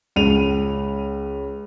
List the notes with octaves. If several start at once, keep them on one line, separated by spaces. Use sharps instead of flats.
C#2 C#4 D#7 F7